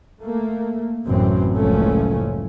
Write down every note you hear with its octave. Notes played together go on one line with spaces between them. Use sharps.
A3 A#3
A1 F#2 A2 C3 E3 C4
F#1 C#2 A2 F3 A3 C#4